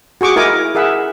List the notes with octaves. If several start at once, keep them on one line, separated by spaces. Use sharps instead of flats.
F#4 G#4 C#6 D6
E4 A#4 D#5 G#5 D6
G#4 A#4 E5 F#5